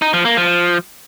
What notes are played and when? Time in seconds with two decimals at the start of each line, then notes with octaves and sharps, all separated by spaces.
0.02 D#4
0.13 F3
0.25 A#3
0.37 F3